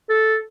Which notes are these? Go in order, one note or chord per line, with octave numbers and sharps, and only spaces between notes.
A4